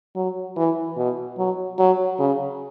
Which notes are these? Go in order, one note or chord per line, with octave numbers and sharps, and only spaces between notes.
F#3
E3
B2
F#3
F#3
C#3